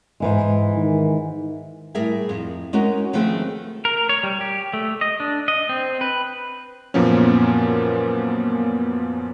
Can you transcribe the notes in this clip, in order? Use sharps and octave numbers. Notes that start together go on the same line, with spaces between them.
G#2 E3 G#3
D#3
A2 G3 G#4 A#4 E5 G#5
F2
G#3 C#4 D#4 F#4 A#4
D#3 F3 A3 C4 G#4 B4
A#4
C#5
G3
G4
A3
D#5
D4
D#5
C4
B4
F#2 A#2 F3 A#3 B3 C#4